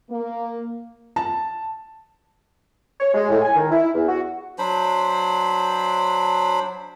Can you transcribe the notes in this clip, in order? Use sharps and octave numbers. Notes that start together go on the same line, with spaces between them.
A#3
A5
C#5
G#3
A2
G#5
D#3
E4
E2
F#4
F#3 D4 C5 B5